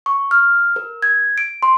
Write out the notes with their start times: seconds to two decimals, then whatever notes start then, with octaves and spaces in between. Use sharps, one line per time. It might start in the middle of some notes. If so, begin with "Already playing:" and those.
0.06 C#6
0.31 F6
0.76 A#4
1.02 G#6
1.38 D7
1.63 C6